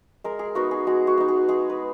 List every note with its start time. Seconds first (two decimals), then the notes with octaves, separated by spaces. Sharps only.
0.24 G#3 A#4
0.39 G#4
0.55 B3 D#4 F#4
0.71 G#4
0.87 G#3 F#4
1.07 F#4
1.17 B3 D#4
1.28 G#4
1.48 G#3 G#4
1.70 B4